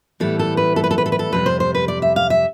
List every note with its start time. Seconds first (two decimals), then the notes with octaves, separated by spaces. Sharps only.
0.20 A2 E3 G3 B3 A4
0.39 A4
0.57 B4
0.76 A4
0.84 B4
0.91 A4
0.98 B4
1.06 A4
1.12 B4
1.19 A4
1.32 F2 C3 G3 B4
1.46 C5
1.60 C5
1.75 B4
1.88 D5
2.02 E5
2.16 F5
2.30 E5